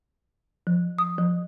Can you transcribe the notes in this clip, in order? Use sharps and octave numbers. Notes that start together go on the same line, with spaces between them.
F3
D#6
F3